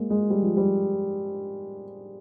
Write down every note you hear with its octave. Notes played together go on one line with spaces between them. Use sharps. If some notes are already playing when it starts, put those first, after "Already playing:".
Already playing: G#3 A#3
G#3
G3
F3
G3